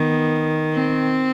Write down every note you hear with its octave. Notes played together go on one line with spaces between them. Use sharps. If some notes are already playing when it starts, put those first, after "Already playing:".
Already playing: D#3 B3
C4